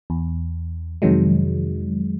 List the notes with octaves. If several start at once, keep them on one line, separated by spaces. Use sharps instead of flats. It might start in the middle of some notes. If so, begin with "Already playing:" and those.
E2
F2 C3 D#3 F#3 G#3